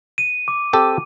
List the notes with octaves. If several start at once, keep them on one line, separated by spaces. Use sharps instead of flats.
D#7
D6
C4 G4 A4